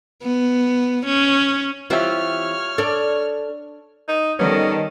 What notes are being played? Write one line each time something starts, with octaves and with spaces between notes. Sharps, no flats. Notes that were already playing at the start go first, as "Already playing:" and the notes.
B3
C#4
E3 C4 F4 G4 C#5 E5 F6
D4 A4 D5
D#4
D#3 G3 B3 C#4 D#4 A4